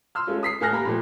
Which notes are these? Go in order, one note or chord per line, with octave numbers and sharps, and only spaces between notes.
C6 E6 F6
G#3 A3 C#4 F4
D#6 B6 C7
A2 A4 G#5 F6 F#6 A#6
A#3 G4 A#5 B5
A#2 F3 A3